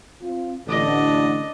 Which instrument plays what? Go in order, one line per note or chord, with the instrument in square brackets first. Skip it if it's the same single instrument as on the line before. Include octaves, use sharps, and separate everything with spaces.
[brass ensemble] C4 F4
[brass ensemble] A1 D3 [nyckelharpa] D4 D#5